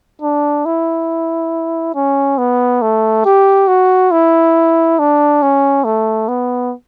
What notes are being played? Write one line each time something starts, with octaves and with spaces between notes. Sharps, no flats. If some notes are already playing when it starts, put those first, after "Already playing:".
D4
E4
C#4
B3
A3
G4
F#4
E4
D4
C#4
A3
B3